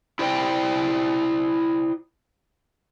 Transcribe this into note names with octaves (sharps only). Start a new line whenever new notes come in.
E4 C5 D5 G5